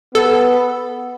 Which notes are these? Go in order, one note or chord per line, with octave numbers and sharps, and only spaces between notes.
B3 A4